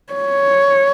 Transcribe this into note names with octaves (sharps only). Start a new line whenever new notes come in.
C#5